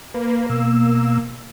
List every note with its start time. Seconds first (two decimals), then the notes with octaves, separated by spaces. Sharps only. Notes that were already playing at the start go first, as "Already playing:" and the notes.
0.14 A#3 B4
0.50 B2 E6